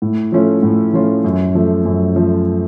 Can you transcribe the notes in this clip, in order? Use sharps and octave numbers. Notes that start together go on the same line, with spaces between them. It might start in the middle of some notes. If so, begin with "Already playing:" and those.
A2
F3 A3 C#4 F4
A2
F3 A3 C#4 F4
F#2
F3 A3
F#2
F3 A3